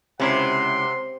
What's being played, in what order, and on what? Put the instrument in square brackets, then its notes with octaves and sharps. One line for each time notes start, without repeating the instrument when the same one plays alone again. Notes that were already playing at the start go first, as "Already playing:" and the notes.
[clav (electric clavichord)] C#2 C#4 E4 [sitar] C3 [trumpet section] F#5 C6